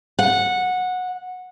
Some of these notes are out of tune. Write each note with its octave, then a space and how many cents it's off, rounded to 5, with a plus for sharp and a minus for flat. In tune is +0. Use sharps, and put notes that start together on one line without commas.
F#5 -15